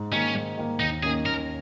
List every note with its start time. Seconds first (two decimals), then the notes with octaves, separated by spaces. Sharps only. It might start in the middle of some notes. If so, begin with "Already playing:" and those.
Already playing: G#2
0.12 D#3 A#3 C#4 D#4
0.34 G#2
0.58 D#3 A#3 D#4
0.80 D#2 D#4
1.03 D#3 A#3 C#4 G#4
1.26 D#2 A#4